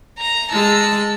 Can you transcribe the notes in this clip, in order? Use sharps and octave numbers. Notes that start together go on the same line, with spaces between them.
A#5 A#6
G#3 A5 E6